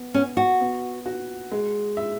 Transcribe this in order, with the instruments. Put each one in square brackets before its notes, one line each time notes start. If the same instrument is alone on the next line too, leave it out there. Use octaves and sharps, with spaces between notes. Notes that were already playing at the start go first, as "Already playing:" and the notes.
Already playing: [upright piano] B3
[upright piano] B3 [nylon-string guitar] C#4
[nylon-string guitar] F#4
[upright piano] B3
F#4
G#3
E5